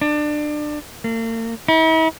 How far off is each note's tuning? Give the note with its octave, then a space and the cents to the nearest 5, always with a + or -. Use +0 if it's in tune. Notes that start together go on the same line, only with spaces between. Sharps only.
D4 +25
A#3 -45
E4 -45